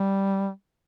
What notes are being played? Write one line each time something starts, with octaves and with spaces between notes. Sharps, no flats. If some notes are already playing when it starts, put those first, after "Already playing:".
Already playing: G3